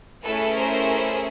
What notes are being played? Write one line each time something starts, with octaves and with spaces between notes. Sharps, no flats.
A3 C#4 E4 G#4 A4 B4
A#4 C5